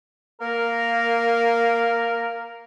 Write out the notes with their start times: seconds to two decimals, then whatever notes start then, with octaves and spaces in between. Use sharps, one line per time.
0.41 A#3 A#4